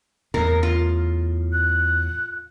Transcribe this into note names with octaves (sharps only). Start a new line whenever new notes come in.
E2 A2 A#4
F4
F#6